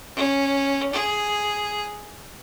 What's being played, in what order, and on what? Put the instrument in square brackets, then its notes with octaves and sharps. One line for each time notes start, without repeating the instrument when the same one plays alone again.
[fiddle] C#4
G#4